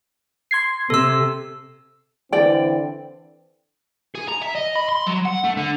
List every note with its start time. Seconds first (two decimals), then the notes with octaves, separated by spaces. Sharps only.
0.51 C6 G#6 C7
0.90 C3 A4 E6
2.33 D3 E3 C4 D5 G5
4.15 G#4
4.28 A#5
4.42 E5
4.55 D#5
4.76 B5
4.89 C6
5.07 F#3
5.26 F#5
5.44 A3
5.57 D3